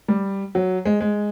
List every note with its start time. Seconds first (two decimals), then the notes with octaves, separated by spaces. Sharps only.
0.08 G3
0.55 F#3
0.85 G#3
1.01 G#3